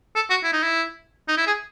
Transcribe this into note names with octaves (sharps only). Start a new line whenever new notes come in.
A4
F#4
E4
D#4
E4
D#4
E4
G#4